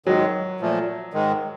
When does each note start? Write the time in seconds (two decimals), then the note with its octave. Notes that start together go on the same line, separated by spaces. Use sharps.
0.06 G#2 D#3 F#3 G#3
0.60 A#2 F3 A3
1.14 G#2 D#3 G#3